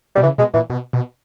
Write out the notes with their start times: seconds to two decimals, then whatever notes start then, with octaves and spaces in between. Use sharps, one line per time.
0.15 B2 G3
0.22 C#3 E3
0.38 B2 G#3
0.54 A#2 E3
0.70 B2
0.93 B2